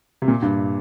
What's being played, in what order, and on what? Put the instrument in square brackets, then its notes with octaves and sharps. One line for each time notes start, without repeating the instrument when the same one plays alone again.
[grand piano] C3
A#2
G2